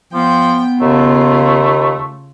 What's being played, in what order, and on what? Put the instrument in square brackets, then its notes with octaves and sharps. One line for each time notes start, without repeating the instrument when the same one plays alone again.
[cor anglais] F3 [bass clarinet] B3 [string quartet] G5
[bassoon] D#2 [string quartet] C#3 F4 [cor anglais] A3